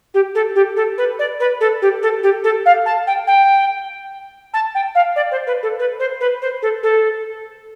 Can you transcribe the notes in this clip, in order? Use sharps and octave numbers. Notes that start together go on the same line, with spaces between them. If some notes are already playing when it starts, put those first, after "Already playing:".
G4
A4
G4
A4
B4
D5
B4
A4
G4
A4
G4
A4
F5
A5
G5
G5
A5
G5
F5
D5
C5
B4
A4
B4
C5
B4
C5
A4
A4